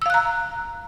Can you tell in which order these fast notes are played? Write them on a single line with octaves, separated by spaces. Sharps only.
E6 F5 F#6 A#5